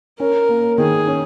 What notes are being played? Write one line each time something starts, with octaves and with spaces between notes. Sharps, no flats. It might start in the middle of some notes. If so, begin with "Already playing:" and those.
C#4 A#4
A#3
D#3 G#4
C#4